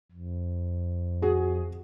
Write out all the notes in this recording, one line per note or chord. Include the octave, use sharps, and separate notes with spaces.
F2
F#4 G#4